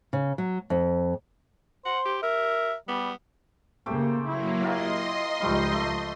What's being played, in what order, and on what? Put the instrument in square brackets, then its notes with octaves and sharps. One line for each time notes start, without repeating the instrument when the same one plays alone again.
[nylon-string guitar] C#3
F#3
F2
[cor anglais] C5 [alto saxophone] F#5
[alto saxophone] G4
[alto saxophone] A#4 [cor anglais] E5
[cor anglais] G3 [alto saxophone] B3
[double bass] C#3 A#3 [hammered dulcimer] A3 G4 C5
[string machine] F#3 A#3 [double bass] E4
[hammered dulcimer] F4 G4 A#4 [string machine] D#5 C6
[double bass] C#2 F3 [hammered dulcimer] G3 A3 D#4
[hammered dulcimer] A3 E5 A5